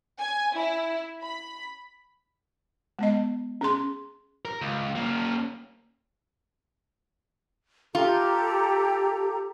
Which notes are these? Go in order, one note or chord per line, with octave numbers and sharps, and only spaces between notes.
G#5
E4
B5
G#3 B3 D#5
C#4 G#4 C6
A#4
C#2
A#3 C#4
F4 G4 A4 A#5